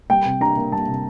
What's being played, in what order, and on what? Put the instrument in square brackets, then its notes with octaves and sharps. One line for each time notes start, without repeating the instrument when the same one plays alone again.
[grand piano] G3 G5
C3
D4 A#5
A#3
G3 A5
C3